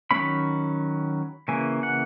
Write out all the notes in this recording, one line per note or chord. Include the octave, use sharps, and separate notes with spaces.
D#3 F#3 A#3 C#4 B5
C#3 E3 A#3 G#5
F#5